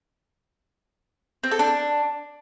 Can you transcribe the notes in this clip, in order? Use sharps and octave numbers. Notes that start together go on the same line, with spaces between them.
C4
A4
D4